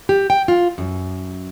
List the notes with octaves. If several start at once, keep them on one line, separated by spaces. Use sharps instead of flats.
G4
G5
F4
F#2